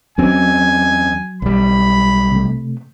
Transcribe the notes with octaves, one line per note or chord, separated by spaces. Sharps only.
E2 F#3 C4 C#4 G#5
B1 G3 B5
C3 A3